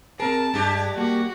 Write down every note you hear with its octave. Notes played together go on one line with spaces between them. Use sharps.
C4 G#4 A#4 A5
G2 G#3 D4 G4
G3 A#3 F#4